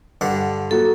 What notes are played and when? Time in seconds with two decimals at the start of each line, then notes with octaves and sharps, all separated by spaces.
0.21 G2 D3 F#5
0.71 F#3 A#3 F#4 A4